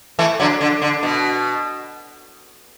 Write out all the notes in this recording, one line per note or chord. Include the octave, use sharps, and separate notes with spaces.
E3 A3
D3 F#3
D3
D3
B2